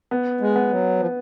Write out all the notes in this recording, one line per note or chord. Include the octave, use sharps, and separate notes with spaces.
B3
G#3
B3
F#3
F3